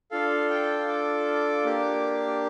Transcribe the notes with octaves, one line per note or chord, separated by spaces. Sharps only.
D4 F4 A4 F5
G5
D6
A#3 D4 G4